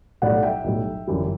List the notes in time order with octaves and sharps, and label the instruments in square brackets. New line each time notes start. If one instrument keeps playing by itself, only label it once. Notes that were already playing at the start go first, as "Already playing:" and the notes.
[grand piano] B1 A2 G3 D5 F#5
E5 G5
B1 A2 G3
G1 F#2 E3 G3